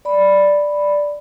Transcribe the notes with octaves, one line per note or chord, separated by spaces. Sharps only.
D5 B5